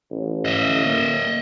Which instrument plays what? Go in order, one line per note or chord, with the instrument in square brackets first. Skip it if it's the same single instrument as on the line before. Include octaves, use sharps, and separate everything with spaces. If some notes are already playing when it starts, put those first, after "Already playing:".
[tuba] A1
[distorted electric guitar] D#5 E5
[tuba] A#3